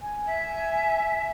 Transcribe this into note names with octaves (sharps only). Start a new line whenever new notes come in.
G#5
E5